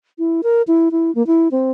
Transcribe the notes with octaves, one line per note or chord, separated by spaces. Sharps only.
E4
A#4
E4
E4
A#3
E4
C4